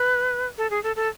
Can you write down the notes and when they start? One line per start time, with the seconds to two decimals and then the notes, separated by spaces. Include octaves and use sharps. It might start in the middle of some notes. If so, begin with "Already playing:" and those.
Already playing: B4
0.58 A4
0.70 G#4
0.83 A4
0.96 A4